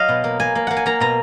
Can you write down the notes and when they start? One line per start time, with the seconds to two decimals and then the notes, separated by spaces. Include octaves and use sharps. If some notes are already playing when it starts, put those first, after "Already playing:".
Already playing: F#3 D#5 F5
0.09 B2
0.24 A#3
0.40 A#3 G#5
0.55 A#3
0.67 A#3 F#5
0.77 G#5
0.86 A#3 A#5
1.00 B2 A#5